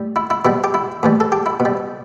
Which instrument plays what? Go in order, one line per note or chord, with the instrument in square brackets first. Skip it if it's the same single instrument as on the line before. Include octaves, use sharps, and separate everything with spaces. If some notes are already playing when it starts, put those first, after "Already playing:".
Already playing: [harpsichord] A2 G3
E4
E4
B2 G3 E4
G4
E4
A2 E3 G3
A4
G4
E4
B2
G3